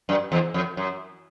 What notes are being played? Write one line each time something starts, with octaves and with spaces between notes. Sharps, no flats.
F#2
E2
F2
F#2